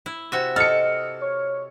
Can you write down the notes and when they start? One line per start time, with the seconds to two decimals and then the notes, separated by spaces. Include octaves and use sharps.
0.06 E4
0.32 C3 F#4 E5
0.56 A4 D#5 F6 C#7
1.21 C#5